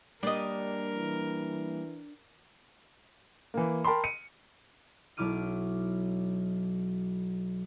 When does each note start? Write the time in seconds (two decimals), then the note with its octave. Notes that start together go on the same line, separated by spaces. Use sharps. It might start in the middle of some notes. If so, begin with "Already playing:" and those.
0.23 G3 A#3 D4 G4 A#4 D#5
0.96 E3
3.54 E3 A#3
3.84 A#4 G5 A5 B5 C6
4.04 C#7 D#7
5.17 B1 F#3 E4 D6 F6 D#7